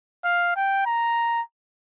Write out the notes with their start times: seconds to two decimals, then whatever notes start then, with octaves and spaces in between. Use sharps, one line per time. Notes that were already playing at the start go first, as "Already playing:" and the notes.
0.24 F5
0.56 G5
0.86 A#5